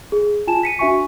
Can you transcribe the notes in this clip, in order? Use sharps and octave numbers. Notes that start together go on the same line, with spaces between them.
G#4
F4 G#5 A5 E7
B6 C#7 D#7
D4 F#4 E5 G#5 C#6